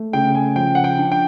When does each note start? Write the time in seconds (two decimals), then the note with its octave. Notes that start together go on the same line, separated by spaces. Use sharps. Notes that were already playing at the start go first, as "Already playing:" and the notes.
Already playing: A3
0.13 C#3 G5
0.35 G#5
0.56 F3 G5
0.75 F#5
0.84 G5
0.98 D4
1.12 G5